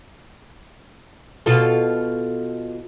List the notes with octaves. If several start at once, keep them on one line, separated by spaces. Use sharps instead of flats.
B2 F4 A4